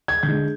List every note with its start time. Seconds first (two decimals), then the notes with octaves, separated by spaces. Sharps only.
0.08 G#6
0.23 D3 G#3 D4 G6